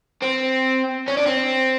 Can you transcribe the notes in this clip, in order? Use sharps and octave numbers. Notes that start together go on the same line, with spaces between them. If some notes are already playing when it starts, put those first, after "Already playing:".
C4
C#4
D4
C4